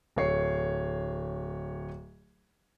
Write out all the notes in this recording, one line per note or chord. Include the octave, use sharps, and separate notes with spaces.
D1 A3 C#5 C7